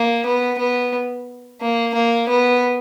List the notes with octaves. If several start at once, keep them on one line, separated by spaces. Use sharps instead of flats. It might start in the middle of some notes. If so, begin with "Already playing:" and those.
Already playing: A#3
B3
B3
A#3
A#3
B3